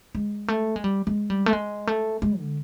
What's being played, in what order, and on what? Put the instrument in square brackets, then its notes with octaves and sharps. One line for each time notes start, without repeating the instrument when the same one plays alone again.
[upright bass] G#3
A3
G#3
G3
G#3
G3
A3
G#3
A3
G#3
D3